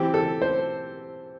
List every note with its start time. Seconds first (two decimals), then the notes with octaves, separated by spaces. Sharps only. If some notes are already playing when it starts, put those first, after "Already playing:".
Already playing: E3 C4 G4
0.14 A4
0.42 C5